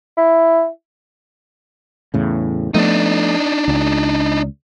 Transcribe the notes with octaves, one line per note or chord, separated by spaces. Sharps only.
E4
E2 A2 C#3
F3 A3 B3 D4 D#4
C#2